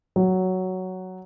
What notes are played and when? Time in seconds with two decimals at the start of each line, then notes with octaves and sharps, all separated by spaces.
0.16 F#3